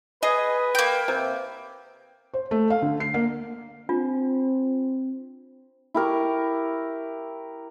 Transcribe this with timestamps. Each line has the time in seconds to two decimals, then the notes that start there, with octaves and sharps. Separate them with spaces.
0.23 G#4 B4 D#5
0.75 A#3 G5
1.08 C3
2.34 C5
2.51 A3
2.70 F5
2.82 D3
3.00 C7
3.14 A#3
3.89 C4 D4 F4
5.94 E4 G4 A#4 C#6